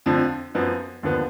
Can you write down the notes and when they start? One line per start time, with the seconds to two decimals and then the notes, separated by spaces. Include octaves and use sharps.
0.06 F2 D3 F3
0.55 F#2 F3 B3
1.03 D#2 D3 F3 B3